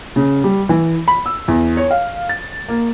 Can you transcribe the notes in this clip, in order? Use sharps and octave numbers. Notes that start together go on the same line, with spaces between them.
C#3
G3
E3
B5
E6
E2
C#5
F5
A6
A#3